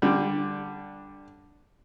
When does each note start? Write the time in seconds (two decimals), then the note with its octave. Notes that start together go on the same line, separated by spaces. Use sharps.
0.02 D3 G3